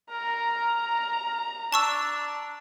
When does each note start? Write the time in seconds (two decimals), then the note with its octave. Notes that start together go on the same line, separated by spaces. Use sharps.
0.11 A#4 A#5
1.73 D4 A5 C#6 E6